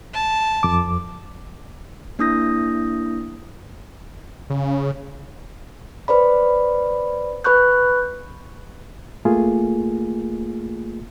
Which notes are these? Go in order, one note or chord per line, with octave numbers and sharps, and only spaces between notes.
A5
F2 D6
A#3 D4 E4 D#6 G6 A#6
C#3
B4 C5 D5 B5
B4 B5 C#6 F#6 G6
A3 A#3 F4 G#4